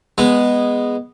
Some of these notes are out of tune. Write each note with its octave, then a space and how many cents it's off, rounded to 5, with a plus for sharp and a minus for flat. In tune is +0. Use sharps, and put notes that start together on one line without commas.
G#3 -10 B3 +0